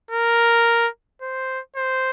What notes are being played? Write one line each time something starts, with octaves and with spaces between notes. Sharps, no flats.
A#4
C5
C5